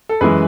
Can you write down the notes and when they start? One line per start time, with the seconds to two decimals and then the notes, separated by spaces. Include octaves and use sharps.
0.09 A4
0.21 F#2 E3 G#3 G#4 B4